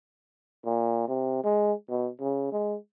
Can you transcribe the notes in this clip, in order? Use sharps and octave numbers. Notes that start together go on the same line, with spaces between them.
A#2
C3
G#3
B2
C#3
G#3